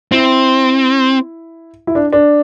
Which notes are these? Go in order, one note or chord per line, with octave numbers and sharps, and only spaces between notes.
C4 E4
E4
D4
D4